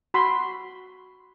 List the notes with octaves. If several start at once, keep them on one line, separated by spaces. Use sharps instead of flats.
F#4 B5 C6